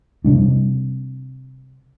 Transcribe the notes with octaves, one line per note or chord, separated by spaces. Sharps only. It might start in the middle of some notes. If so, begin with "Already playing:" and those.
C3 G3 D4